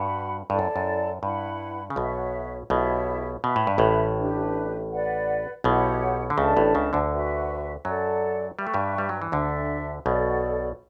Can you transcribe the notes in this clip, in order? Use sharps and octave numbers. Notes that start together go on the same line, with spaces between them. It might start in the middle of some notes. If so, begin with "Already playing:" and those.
Already playing: G2 F#4 B4 F#5 B5
G2 E4 A4 D5 A5
F#2
F#2
G2 E4 B4 F#5 B5
C#3
B1 B2 F#4 C#5 E5
B1 B2 E4 G4 C#5 E5
B2 B4 E5 B5
A2
G2
A1 A2
D4 G4 B4
B4 D5 F#5
B1 B2 E4 G4 C#5 F#5
D3
C#2 C#3 D4 A4 E5 A5
A1 A2
C#2 C#3
D2 D3
F#4 B4 E5
F#2 F#3 A4 D5 F#5
G3 B4 E5 G5 C#6
A3
G2 G3
G3
F#3
E3
D2 D3 D4 A4 E5
B1 B2 F#4 A4 D5